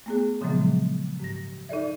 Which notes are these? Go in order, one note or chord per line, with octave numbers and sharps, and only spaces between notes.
A3 B3 G#4
A#2 C#3 F3 F#3 G#3 B3
G#2 A#6
D#4 A4 D5 E5